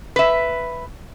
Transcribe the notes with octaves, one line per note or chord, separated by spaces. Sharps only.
B4 E5